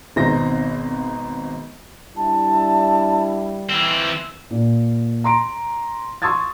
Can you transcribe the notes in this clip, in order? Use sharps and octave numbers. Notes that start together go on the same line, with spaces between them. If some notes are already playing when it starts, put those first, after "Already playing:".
G#1 B2 C4 D#4 A#6
G3 D4 E4 A5
E3 C4 E6
A#2
A#5 C6 D7
C6 C#6 D#6 E6 G#6 A6